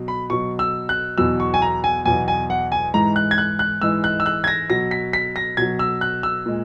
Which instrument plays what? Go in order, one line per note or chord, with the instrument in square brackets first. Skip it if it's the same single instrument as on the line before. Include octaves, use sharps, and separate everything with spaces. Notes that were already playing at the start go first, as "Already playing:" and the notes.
Already playing: [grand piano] B2 F#3
B5
B2 F#3 C#6
E6
F#6
E2 B2 F#3 E6
C#6
G#5
A#5
G#5
E2 B2 F#3 G#5
G#5
F#5
G#5
G#2 E3 G#3 A#5
F#6
G#6
F#6
F#6
G#2 E3 G#3 E6
F#6
E6
F#6
G#6
A#6
B2 F#3 A#6
B6
B6
A#6
B2 F#3 G#6
E6
F#6
E6
A#2 G#3